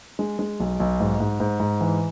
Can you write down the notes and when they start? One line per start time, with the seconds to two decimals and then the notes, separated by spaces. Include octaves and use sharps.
0.19 G#3
0.39 G#3
0.60 B1
0.80 B1
1.00 G#2
1.20 G#2
1.40 G#2
1.60 G#2
1.81 E3